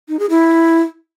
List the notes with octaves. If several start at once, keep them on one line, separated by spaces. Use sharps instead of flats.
D#4
G#4
E4